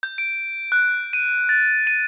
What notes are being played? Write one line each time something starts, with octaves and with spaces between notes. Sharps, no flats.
G6
D7
F#6
D#7
A6
D#7